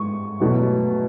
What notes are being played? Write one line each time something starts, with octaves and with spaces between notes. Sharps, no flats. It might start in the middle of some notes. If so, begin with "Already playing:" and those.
Already playing: G#2 G#3 C#6
E2 B2 F#3 A3